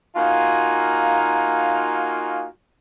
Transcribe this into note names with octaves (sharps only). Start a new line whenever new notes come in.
A#3 D#4 F4 F#4 F5 G#5